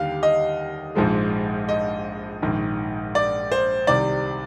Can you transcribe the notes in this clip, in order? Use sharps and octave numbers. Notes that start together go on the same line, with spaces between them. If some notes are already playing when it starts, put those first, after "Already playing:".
Already playing: D#2 D3 G3 F5 G5
D#5
A#1 G#2 F3 G#3
D#5
A#1 G#2 D#3
D5
C5
C2 C3 D#3 D5